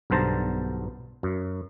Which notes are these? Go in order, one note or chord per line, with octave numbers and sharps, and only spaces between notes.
B1 G2 D3 C5 A5 A#5
F#2